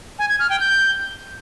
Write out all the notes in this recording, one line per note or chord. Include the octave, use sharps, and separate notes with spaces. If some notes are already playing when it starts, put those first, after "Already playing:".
G#5
G#6
F6
G5
G6